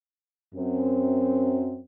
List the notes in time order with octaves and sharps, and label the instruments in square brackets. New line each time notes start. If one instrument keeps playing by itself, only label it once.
[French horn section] F#2 C4